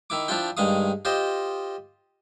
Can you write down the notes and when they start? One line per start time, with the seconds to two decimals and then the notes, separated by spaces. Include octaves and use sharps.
0.10 D#3 E4 D6
0.28 F3 D4 E4 F4 G5
0.57 G2 D#3 G#3 F5 D#6
1.05 F4 G4 C5 D#5